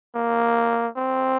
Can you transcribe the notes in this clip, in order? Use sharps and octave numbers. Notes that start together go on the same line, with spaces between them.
A#3
C4